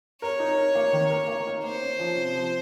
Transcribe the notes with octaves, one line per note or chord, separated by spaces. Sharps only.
A#4 C#5
D#4
A#4
A#3
D#3
A#4
A#3
D#4
A#3 C5
C#4
F3
C3
F3